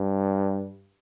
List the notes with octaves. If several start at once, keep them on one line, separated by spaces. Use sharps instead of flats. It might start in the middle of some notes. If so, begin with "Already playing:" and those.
Already playing: G2